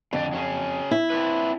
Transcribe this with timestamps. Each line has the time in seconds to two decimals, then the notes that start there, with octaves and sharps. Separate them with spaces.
0.13 F2 A2 D3 D5
0.33 F#3 C#4 G#4
0.91 E4
1.10 C4 D4 B4